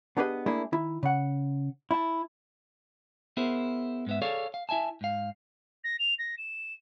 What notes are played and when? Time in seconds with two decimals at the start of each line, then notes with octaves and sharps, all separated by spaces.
0.17 B3 D4 G4 G#4 B4 D#5
0.46 A3 A#3 D4 E4 G#4
0.72 D#3 E4
1.03 C#3 F#5
1.91 E4 A5
3.37 B3 E4 G#4 A#4 C5
4.07 G#2 B3 E5
4.22 G#4 A4 C#5 D5 F5
4.54 F5
4.69 E4 E5 G#5 A5
5.01 G#2 F5
5.84 A#6
5.99 F7
6.18 A#6
6.37 E7